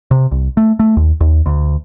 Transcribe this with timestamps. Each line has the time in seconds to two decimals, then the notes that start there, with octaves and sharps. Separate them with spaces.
0.11 C3
0.31 C2
0.57 A3
0.79 A3
0.97 D#2
1.20 D#2
1.46 D2